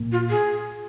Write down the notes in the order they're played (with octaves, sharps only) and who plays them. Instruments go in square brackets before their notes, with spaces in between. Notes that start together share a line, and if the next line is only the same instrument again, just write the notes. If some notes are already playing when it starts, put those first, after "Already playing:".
Already playing: [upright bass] A#2
[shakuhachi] F4
G#4